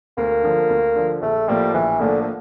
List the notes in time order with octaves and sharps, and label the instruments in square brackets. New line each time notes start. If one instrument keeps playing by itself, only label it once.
[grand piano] D2 [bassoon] A#3
[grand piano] D3 F3
D2
D3 F3
[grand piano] A#1 [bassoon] A3
[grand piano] A2 F3 A#3 [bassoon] G3
[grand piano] A#1 [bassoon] E3
[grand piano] A2 F3 A#3 [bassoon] D3
[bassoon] D3